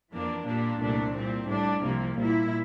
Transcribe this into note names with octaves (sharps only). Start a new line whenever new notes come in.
F2 E3 A#3 D4
A#2 G3 A#3 D4
C2 A#2 A3 D4
A#2 G3 C4
A2 G3 D4
C2 C3 F3 A#3
A#2 G3 A#3 E4